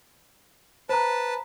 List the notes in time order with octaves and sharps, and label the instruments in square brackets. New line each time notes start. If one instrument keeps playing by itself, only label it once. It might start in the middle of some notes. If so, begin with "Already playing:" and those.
[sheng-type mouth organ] B4 A5 [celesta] C5 A#5